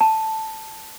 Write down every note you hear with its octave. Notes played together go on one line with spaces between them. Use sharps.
A5